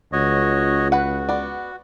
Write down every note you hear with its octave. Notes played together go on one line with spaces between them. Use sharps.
C#2 F#4 C#5 D#5
F#4 B4 F#5
B3 D5